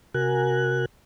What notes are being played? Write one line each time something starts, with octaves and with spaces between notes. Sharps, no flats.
C3 F#4 A#4 G#5 F#6